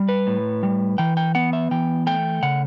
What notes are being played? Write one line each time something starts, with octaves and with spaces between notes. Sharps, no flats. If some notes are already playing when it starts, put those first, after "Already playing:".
Already playing: G3
B4
A2
G3
E3 G5
G5
B3 F#5
E5
E3 G5
A3 G5
C#3 F#5